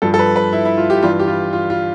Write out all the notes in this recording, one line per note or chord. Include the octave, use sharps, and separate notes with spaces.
G2 F3 A4
A4
B4
B4
E4
E4
F4
G4
G2 E3 G3 F4
G4
F4
F4
F4